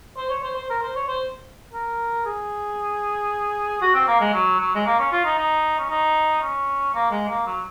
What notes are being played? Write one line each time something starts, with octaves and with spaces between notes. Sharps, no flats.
C5
C#5
C5
C5
A#4
C5
C#5
C5
A#4
G#4
F#4
C4
A#3
G#3
F#3
F#3
G#3
A#3
C#4
F4
D#4
D#4
C#4
D#4
C#4
A#3
G#3
A#3
F#3